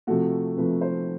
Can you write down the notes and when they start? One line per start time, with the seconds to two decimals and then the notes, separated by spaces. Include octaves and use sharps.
0.07 C3 F3 A3 F#4
0.57 C3 F3 A3 B4
0.81 C5